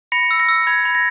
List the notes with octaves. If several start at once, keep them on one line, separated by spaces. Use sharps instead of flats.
B5 A#6 C#7
E6
A#6
E6
B5 G#6
B5
A#6